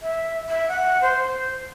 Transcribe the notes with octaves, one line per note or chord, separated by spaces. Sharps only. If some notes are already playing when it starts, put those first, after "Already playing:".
E5
E5
F#5
C5